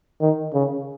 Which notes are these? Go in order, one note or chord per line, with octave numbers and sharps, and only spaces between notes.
D#3
C#3